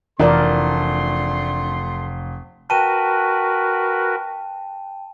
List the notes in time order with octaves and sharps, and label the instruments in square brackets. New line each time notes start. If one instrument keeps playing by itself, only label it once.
[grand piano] F1 [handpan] E3 A#4 D5 [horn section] A3 A4 C6 [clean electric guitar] D4
[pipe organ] F#4 A#4 B4 [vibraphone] G5 [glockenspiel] A5 D#7